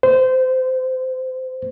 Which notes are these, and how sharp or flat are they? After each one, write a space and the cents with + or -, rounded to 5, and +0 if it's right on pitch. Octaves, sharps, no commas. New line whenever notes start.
C5 -20